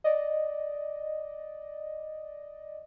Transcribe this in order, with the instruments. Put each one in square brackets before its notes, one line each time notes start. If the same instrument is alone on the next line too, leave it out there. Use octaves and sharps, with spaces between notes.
[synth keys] D5 D#5